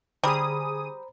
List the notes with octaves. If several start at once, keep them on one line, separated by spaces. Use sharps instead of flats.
D3 G3 G#4 C5 A#5 B5 D#6